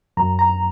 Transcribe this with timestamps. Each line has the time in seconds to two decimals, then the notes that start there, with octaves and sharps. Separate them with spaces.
0.17 F#2 A#5
0.39 A#5